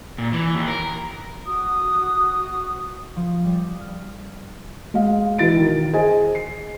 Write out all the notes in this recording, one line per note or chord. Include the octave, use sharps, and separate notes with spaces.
A#2
E3
D#2
A#4
F#4 D#6
F3
G3
D#6
F6
G#3 F5
B2 E3 E4 A6 D7
D#3
G#4 C5 D#5 G#5
C7